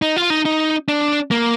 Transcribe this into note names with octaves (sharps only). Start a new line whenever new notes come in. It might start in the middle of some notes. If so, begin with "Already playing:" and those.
D#4
F4
D#4
D#4
D4
A#3